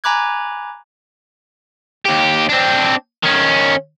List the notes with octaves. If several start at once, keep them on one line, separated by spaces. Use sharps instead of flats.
G#5 A#5 B5 D6 F#6 G#6
D#2 G4
C4 D4
D#3 C#4